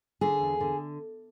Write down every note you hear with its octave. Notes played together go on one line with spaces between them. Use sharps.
D3 G#4
E2
D3